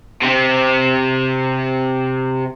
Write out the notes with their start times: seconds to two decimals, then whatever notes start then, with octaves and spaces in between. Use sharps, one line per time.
0.22 C3 C4